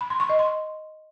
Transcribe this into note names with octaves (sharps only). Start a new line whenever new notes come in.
B5
C6
C#6
D#5
C6